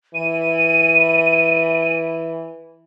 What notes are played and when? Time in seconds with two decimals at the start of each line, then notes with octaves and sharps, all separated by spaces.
0.15 E3 D#7